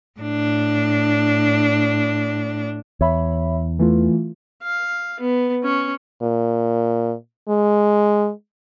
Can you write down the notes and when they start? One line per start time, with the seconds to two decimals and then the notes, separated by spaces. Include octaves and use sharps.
0.20 A2 D4
3.01 E2 C#5 E5 B5
3.79 E3 A3 F4
4.63 F5
5.20 B3
5.64 C#4
6.22 A#2
7.49 G#3